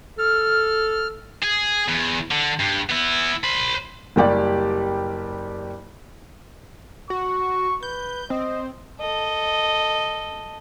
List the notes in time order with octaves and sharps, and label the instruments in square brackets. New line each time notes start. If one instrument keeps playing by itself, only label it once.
[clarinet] A4 [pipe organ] F6
[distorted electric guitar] G#4
E2
D3
G2
B3 E4
C5 B5
[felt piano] F#1 G3 G4 D5
[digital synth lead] F#4 [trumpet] C#6
[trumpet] B4 [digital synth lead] G6
[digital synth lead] C4 [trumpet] D#5
[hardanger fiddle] A4 D#5